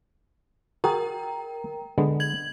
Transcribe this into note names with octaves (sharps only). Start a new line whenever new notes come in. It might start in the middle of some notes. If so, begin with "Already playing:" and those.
F#4 G#4 A#4 G5 A#5
D3 G#3 B3
G#6 F#7